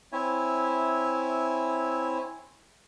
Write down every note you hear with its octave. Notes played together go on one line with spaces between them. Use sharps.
C4 E4 C#5 E5 G#5